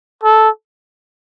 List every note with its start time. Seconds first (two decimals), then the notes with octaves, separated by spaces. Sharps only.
0.24 A4